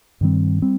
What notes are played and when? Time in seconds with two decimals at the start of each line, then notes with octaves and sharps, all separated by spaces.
0.21 G2 D#3 G3 C4
0.62 G3 C4